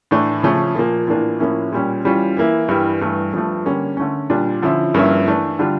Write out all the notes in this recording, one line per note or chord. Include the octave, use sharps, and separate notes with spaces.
A2 E3 A3 D4
C#3 F3 A3 C#4
A#2 F3 A#3
A2 E3 A#3 D4 F4
A2 F3 A#3 C#4 E4
A#2 G3 C#4
E3 G3 C#4 F4
E3 A#3 E4
G2 E3 G3
G2 E3 A3
G2 F3 A3
D3 G3 A#3 C#4
D3 A3 C#4
A#2 G3 D4 F4
D3 F3 C#4 E4
G2 F3 A#3 C#4 E4
E3 A3 D4
D3 G3 D4 F4